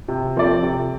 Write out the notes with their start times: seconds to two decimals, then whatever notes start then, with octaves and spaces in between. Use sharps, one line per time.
0.08 C3
0.36 F3 C4 A4 D5
0.63 C3